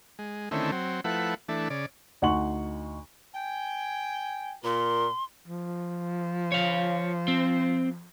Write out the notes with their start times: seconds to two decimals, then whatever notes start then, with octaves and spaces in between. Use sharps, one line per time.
0.19 G#3
0.51 D3 D#3 A3 C4 C#4 E4
0.72 F#3 C4
1.04 F3 A3 E4 B4 F#5
1.49 E3 A3 D4
1.70 C#3 D5
2.22 D2 D#4 F#5 C6 C#6 F#7
3.35 G5 G#5
4.64 A#2 A#4 C6
5.48 F3
6.52 C#5 F5
7.28 C4